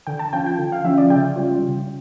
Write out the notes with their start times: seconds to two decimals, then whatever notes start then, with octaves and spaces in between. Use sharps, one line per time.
0.07 D3 G5
0.19 A5
0.33 F3 C#4 F4 G5
0.46 G5
0.58 D3
0.72 F5
0.85 F3 C#4 F4 E5
0.98 D5
1.10 C#3 G5
1.36 G3 C#4 F4
1.62 C#3